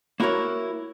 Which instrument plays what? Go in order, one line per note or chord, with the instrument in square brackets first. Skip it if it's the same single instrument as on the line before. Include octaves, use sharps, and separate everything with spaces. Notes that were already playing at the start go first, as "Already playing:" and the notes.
[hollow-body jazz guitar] A#3 E4 F#4 G#4 A#4 C#5